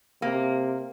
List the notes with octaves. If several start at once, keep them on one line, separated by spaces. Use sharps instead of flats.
C3 A#3